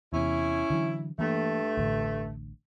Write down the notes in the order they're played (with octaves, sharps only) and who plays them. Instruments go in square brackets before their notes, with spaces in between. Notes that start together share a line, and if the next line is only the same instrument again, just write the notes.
[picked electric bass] E2 C3 [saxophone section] C#4 E4
[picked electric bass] D3 E3 F#3
[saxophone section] G2 A3 [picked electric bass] E3 A#3
[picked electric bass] D1 A1 D2